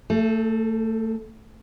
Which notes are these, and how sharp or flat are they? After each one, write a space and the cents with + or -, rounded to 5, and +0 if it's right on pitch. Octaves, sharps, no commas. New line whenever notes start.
A3 +25 A4 -30